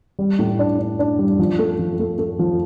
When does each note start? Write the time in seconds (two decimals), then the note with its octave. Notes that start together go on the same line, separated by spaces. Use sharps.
0.19 G3
0.39 A2
0.59 D4
0.79 D4
0.99 D4
1.19 G3
1.39 F3
1.59 A3
1.79 F3
1.99 A3
2.19 A3
2.39 F3